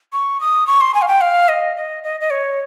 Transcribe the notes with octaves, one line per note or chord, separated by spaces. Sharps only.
C#6
D#6
C#6
C6
G#5
F5
G5
F5
D#5
D#5
D#5
D#5
C#5